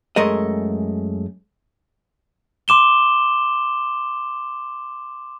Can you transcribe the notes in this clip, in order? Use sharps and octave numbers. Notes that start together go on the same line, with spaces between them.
F#2 G#3 A3 A#4 D#5
C6 D6 E7 G7